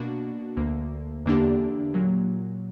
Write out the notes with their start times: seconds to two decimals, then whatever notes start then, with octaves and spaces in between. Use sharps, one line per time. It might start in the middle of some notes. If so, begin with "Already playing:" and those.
Already playing: B2 A#3 D4 F#4
0.56 D2 D3 A#3
1.25 E2 D3 A#3 D4 G4
1.94 A#2 F#3 A#3